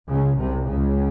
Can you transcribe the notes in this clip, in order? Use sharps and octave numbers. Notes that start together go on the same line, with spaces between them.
C#2 C#3
C2 C3
C#2 C#3